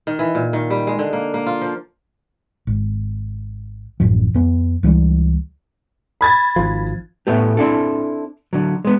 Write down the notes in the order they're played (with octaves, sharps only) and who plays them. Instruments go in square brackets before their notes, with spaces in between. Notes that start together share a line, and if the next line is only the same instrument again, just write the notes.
[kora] D#3
E3
A#2
D#3
G3
G#3
D3
A#3
A#3
F4
F3
[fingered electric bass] G#1
A1 F#2 F3
F2 B3
C#2 E3 F#3 G3
[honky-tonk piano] B5 G#6 A6
[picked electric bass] G#1 F3
[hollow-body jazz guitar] A2 A3 B3 G4
C4 D4 E4 A4
D3 F#3
G#3 B3